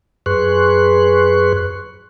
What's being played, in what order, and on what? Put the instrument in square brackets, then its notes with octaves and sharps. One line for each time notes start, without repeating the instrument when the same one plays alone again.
[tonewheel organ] F#2 G#4 B4 C6 C#6 F#6